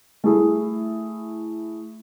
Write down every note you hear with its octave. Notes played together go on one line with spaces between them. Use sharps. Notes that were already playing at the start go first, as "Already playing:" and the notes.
A3 E4 G#4